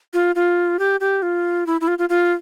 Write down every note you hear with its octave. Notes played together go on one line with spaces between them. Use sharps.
F4
F4
G4
G4
F4
E4
E4
F4
F4
F4